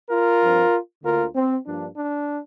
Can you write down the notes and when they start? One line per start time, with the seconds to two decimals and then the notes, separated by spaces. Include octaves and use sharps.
0.10 F4 A#4
0.41 G2 F3 C4
1.04 D2 D3 A#3 F4 A#4
1.35 C4
1.66 G2 F3 A#3 D4
1.97 D4